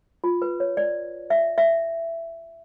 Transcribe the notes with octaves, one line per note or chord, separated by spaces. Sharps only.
F4
B4
C#5
D5
E5
E5